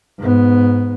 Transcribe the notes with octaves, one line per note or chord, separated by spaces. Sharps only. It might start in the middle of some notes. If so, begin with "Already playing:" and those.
G#2 B3